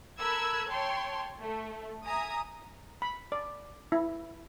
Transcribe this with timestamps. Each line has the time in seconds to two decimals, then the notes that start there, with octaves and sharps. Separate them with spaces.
0.18 A4 A#4 B5 E6 F#6 G#6
0.68 C#5 G5 A5 C6
1.40 A3
2.05 E5 G#5 A#5 D#6
3.02 B5
3.32 D5
3.92 E4